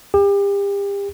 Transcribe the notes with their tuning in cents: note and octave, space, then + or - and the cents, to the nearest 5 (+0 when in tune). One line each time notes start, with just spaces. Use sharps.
G4 +35